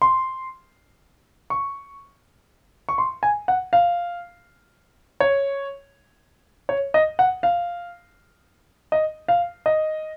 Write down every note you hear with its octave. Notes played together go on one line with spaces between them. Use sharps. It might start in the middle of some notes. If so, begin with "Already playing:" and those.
C6
C#6
C#6
C6
G#5
F#5
F5
C#5
C#5
D#5
F#5
F5
D#5
F5
D#5